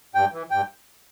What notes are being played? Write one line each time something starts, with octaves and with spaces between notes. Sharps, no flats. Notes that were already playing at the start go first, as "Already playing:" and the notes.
G2 G5
E3
G2 G5